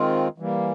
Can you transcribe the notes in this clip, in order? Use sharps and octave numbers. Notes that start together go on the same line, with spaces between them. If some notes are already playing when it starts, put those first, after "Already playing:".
Already playing: D#3 G#3 C4 F4
E3 G3 A#3